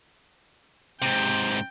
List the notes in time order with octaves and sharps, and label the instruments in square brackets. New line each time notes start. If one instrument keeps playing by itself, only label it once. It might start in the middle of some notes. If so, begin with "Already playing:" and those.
[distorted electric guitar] G#2 C3 [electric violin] G5